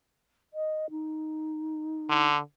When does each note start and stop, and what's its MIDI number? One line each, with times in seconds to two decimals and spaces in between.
0.54 0.90 75
0.90 2.29 63
2.09 2.39 50